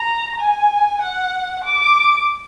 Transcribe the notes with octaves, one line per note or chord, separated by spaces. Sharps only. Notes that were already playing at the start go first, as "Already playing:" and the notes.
Already playing: A#5
G#5
F#5
D6